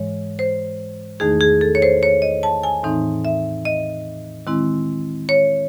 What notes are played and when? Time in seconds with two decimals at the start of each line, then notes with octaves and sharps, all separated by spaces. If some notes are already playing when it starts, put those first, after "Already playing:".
Already playing: G#2 E3 G#3 C#5
0.39 C5
1.20 E2 D#3 A3 D#4 G#4
1.41 G#4
1.61 A4
1.75 C#5
1.82 C5
2.03 C#5
2.22 D#5
2.43 A5
2.63 G#5
2.83 A2 E3 C4 D#4
3.25 E5
3.65 D#5
4.47 D#3 G#3 C4 E4
5.29 C#5